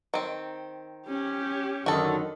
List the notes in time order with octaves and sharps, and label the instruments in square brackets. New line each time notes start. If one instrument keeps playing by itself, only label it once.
[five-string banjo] D#3 C4
[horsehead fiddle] C#4 G4
[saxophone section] F#2 D3 D#3 [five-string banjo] F#4 A4